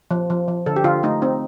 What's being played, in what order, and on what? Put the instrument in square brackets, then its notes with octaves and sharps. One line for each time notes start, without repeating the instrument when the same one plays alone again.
[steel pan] F3
F3
F3
D3 A4
G4
D3 F4
A3 D#4
C4 D#4